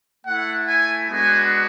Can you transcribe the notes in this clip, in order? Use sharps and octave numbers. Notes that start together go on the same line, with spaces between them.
A3 E4 F#5
G#5
G#3 B3 D4 F#4 G#5